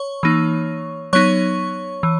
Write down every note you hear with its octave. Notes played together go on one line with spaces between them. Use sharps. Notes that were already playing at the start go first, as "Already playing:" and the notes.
Already playing: C#5 C#6
E3 A#3 D#4
F#3 B3 D#4 C#5 C#6
E3